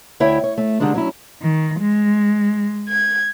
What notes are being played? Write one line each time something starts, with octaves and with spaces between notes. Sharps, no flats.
D2 E4 C#5 E5 G5
C#5
A3
D3 D#3 G3 G#3 D4
F#3 C#4 E4
D#3
G#3
G#6